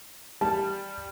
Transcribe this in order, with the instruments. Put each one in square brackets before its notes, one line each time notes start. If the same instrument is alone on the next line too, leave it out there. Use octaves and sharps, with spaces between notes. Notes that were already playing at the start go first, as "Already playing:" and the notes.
[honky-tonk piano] G3 [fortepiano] A5